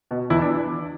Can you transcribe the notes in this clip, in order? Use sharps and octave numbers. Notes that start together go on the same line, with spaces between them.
B2
E2 E4
D4